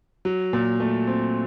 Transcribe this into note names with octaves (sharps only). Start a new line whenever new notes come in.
F#3
A#2
A3
C4